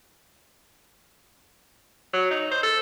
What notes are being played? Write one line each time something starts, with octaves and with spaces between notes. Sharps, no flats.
F#3
D#4
C5
A4